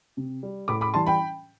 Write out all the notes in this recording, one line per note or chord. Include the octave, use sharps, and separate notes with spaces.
C3
G3
A2 B5 D6
B5 D6
E3 G3 A5 C6
G5 B5